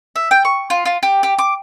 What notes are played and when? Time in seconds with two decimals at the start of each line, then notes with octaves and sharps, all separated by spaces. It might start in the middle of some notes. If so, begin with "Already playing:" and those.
0.16 E5
0.31 G5
0.45 C#6
0.70 F4
0.85 F4
1.03 G4
1.23 G4
1.39 D6